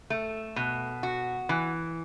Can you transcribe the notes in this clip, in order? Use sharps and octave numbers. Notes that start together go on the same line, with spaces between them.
A3
B2
F#4
E3